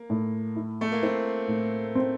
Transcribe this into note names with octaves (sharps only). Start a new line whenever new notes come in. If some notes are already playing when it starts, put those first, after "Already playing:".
Already playing: A#3
A2
E4
A3
A#3
C4 E4
A2
C4